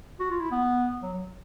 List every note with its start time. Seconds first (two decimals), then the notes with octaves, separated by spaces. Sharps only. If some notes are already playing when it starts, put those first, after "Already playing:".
0.20 F#4
0.30 F4
0.40 E4
0.51 B3
1.02 F#3